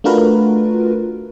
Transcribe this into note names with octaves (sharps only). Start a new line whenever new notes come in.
A3 D4 F4 F#4 A#4 B4